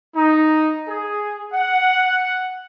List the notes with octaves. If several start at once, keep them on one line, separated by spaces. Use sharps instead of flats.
D#4
G#4
F#5